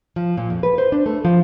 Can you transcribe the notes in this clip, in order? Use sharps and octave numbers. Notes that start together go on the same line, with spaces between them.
F3
A#2
F2
B4
C5
D4
A3
F3